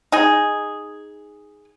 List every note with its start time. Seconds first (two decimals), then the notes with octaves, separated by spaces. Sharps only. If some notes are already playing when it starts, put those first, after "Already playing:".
0.12 D#4 G#4